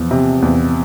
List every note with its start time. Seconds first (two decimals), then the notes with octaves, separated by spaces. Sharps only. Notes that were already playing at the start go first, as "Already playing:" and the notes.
Already playing: E2 F3
0.11 C3
0.42 E2